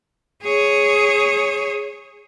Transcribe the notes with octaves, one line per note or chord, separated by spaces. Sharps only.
G#4 C#5